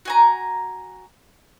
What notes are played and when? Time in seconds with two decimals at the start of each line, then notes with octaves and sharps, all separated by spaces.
0.05 F#4 G#5 A#5